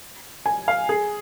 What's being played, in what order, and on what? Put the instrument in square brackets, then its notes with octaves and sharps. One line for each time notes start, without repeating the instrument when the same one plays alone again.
[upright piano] G#5
F5
G#4